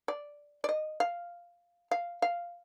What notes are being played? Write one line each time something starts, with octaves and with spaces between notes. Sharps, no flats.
D5
D5
D#5
F5
F5
F5